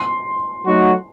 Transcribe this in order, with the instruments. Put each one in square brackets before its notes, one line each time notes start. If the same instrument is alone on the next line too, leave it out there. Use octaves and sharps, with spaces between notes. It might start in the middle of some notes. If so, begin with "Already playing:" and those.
Already playing: [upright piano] C6
[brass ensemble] F#3 A3 D#4 F#4